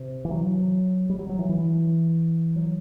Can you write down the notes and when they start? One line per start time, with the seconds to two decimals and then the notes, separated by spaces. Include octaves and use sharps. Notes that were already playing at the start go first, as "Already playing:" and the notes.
Already playing: C3
0.25 E3
0.31 F#3
1.09 G3
1.19 F#3
1.29 F#3
1.39 E3
1.49 E3
2.56 F#3